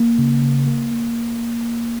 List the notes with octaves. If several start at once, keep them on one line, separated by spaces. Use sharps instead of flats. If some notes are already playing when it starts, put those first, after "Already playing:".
Already playing: A#3
C#3
C#3
A#3
A#3